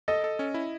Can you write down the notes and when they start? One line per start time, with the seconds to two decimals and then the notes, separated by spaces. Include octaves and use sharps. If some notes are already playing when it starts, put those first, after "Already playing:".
0.08 A4 D#5
0.24 A4
0.39 C#4
0.54 E4